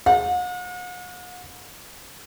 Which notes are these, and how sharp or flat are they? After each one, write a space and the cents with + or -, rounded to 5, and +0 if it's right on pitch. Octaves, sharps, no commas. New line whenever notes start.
F#5 -45